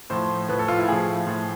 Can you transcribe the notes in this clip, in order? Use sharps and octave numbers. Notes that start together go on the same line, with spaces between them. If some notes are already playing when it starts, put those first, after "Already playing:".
A2 F3 C5
A2 F3 B4
A4
F4
E4
A2 F3 G#4
A2 F3